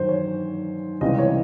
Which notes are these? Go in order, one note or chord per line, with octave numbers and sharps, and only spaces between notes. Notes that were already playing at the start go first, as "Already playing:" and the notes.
Already playing: G2 D#3 F#3 C5
C#5
C#2 C3 E3 G3 D#5
C#5